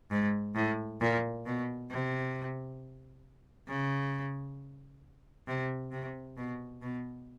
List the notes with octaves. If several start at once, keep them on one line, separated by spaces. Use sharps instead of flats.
G#2
A2
A#2
B2
C3
C#3
C3
C3
B2
B2